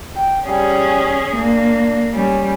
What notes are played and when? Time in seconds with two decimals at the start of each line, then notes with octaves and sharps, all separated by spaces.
0.16 G5
0.47 G3 C#4 G#4
1.36 A#3 D4
2.14 G3 C#4